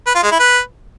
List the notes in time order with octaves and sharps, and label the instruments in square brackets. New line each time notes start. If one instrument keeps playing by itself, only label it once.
[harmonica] B4
F4
G#3
E4
B4